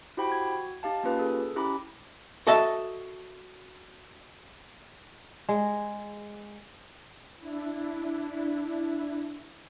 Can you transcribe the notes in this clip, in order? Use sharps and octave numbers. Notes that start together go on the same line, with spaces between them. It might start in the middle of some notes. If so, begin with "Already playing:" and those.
E4 F#4 G4 C5 G5 B5
F#4 G#6
D#4 G4 F5 A5
A#3 C#4 F4 G4 B4
G#4 A4
C#4 E4 G4 A#5 B5 D6
F#4 A4 D#5 E5 A5
G#3
D4 E4